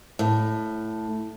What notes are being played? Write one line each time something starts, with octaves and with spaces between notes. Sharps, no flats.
A2